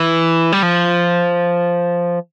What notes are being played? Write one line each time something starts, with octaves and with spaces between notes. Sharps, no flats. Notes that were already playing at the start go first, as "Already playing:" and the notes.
Already playing: E3
G3
F3